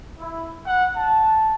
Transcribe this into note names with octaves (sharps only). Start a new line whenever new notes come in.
E4
F#5
A5